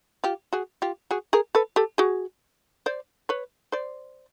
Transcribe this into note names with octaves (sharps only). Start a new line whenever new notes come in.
F4 G4
F#4 G#4
F4 G4
F#4 G#4
G#4 A#4
A4 B4
G4 A4
F#4 G#4
C5 D5
B4 C#5
C5 D5